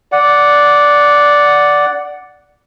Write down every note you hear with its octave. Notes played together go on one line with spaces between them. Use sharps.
D5 F#5